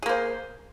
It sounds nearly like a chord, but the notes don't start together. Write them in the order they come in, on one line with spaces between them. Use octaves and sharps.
G#4 A#3 C5